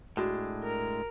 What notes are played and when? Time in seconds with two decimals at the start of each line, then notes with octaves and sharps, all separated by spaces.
0.17 A2 G#3 D4 F#4
0.64 A#4